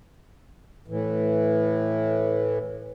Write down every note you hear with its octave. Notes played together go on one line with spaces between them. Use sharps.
A2 E3